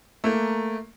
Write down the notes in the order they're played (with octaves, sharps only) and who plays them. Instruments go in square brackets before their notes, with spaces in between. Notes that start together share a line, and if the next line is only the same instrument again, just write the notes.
[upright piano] A3 A#3